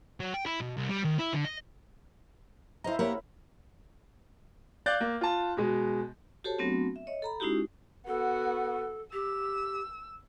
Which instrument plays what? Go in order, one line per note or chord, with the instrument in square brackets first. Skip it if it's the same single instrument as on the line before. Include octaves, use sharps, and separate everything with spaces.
[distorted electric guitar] F#3
G5
E4
B2
C2
G3
D#3
E4
D3
D#5
[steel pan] E4 C5 A#5 [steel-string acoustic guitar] D#5 F5
[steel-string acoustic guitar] A#3 G4 F#5 [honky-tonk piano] A#4 C#5 [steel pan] B5
[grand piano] D5 F5 F#6 G6 A6
A#3
F4 A5
B2 G#3
[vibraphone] F#4 G4 A4 C5 C#5 A5
F#3 A3 B3 C4 D4 F#4
E5
C#5 D#5
A4 A#5 B5
G#3 C#4 D#4 E4 F#4 G4
[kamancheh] B3 F#4 [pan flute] A4
[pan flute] G4 [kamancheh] E6